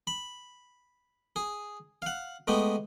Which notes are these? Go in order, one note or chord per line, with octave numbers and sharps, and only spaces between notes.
B5
G#4
F5 F#5
G#3 A3 B3 G4